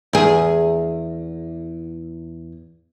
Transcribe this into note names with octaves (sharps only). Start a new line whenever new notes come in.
E2 G#4